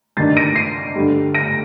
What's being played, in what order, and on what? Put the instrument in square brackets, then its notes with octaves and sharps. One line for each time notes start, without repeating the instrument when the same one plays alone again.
[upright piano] G2 D#3 A#3 D4 A6 C7
A#6 D7
C7 D#7
G2 D3 G3
A#6 D7